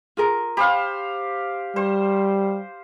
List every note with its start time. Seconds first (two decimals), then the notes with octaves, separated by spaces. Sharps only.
0.17 F4 G#4 A#4
0.57 G4 C5 F5 B5
1.76 G3 C5